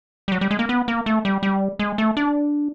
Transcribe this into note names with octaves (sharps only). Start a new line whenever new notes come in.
G3
F#3
G3
G#3
A#3
B3
A#3
A3
G3
G3
G#3
A3
D4